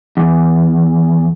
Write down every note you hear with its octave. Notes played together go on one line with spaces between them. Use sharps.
E2